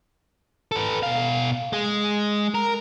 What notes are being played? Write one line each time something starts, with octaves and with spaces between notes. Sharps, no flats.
A4 B4
B2 F5
G#3
A#4